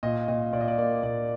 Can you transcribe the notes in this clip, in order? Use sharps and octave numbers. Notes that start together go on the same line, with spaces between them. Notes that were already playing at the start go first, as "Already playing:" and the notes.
A#2 D#5
A#2 D#5
A#2 D5
D#5
D5
A#3 D5
A#2 D5